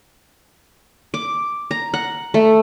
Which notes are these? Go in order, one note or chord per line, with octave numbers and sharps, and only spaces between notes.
D6
A#5
F#5
A3